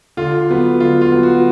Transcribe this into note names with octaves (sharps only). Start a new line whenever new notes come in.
D3 F4
F#3 B3
D3 F4
F4
F#3 B3
F#4